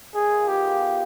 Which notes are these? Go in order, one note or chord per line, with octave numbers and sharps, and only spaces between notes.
D#3 G#4
F4
B3 G4
F4